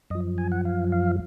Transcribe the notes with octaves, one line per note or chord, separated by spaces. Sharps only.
F#2 F3 D#5
G#5
F#5
F5
F5